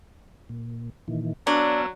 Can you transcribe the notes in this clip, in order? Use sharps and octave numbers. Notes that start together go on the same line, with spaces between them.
A#2
A#2 D#3 E3
F#3 B3 D4 F5 E6